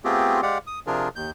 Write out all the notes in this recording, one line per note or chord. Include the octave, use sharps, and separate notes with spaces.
A3 B3 C4 F4 G4 G#4
G#3 G4 D5 F5 F#5
D#6
C3 F3 D4 F4 G#4 A#4
D#2 G6